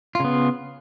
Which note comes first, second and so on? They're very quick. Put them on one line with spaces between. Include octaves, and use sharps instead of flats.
F4 C#3 B3